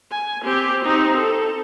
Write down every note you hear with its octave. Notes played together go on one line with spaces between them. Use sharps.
G#5
C4 G4
C4 D#4
A4